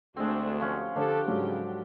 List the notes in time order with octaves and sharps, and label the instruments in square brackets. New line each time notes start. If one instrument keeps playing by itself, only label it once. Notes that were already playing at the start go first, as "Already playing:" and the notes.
[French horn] D2 [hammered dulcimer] G#3 C4 [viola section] A3 D4 F#4
[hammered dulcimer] F3 C#4 F#5 [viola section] G4
[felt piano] D3 C5 D5 [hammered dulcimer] D4 [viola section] G4 [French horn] A4
[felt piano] G#2 F#3 A4 [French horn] C#3